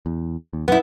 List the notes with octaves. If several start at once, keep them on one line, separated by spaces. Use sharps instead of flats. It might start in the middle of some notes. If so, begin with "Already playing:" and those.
E2
D#2
F#2 B2 B3 E4